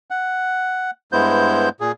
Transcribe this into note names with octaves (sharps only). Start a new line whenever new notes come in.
F#5
G2 G#3 B3 E4 C5 G6
A#2 G#4